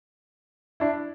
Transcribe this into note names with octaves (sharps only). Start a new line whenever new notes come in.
D4 E4